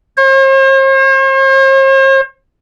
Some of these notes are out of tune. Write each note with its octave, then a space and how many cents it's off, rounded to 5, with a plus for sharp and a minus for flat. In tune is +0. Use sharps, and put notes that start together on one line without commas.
C5 +45